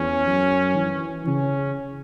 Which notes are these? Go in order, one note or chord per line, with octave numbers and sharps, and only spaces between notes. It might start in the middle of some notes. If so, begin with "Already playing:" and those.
Already playing: E2 C#4
F#2
E3
C#3 C#4